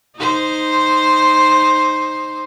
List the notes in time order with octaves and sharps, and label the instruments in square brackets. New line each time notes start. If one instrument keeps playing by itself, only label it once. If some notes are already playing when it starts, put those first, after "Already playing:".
[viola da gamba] D#4 C5